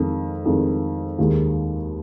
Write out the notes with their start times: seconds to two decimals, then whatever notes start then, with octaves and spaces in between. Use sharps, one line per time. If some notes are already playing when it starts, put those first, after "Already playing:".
Already playing: F2 D#3 G#3
0.45 F2 D#3 G#3
1.18 D#2 D#3 G#3